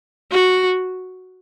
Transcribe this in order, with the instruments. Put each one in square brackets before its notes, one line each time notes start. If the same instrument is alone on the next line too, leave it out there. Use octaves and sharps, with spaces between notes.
[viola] F#4